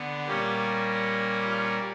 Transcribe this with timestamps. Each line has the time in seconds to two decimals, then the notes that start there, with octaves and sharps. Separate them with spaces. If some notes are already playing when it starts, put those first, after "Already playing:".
Already playing: D3 B3
0.27 A#2 G3 A#3 C#4 G4
1.42 F4